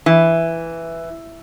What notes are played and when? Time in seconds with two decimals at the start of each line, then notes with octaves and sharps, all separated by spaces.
0.06 E3